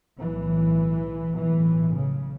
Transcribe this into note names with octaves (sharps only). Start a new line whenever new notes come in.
B1 A2 E3
B1 A2 E3
C#3